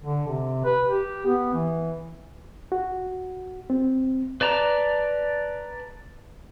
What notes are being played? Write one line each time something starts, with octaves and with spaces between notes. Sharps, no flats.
D3
C3
B4
G4
B3
E3
F#4
C4
B4 D5 A5 A#5